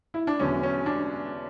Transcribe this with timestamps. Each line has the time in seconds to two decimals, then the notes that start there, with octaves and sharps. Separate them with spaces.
0.14 E4
0.27 D4
0.40 E1 E2 D3 F#3 C#4
0.63 C#4
0.86 D4